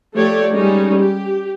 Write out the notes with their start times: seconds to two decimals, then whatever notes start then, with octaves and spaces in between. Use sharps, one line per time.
0.15 F3 A3 G4 C#5 D5
0.51 G3 G#3 C#4 D#4
0.99 G4